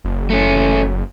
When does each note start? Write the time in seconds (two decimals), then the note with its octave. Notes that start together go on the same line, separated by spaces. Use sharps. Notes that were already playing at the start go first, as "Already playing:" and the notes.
0.04 F#1
0.30 A3 C#4